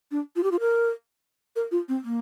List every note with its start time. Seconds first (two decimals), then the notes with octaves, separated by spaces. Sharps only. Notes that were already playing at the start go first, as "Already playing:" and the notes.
0.11 D4
0.36 F4
0.43 G4
0.51 F4
0.60 A#4
1.56 A#4
1.71 F4
1.89 C4
2.04 A#3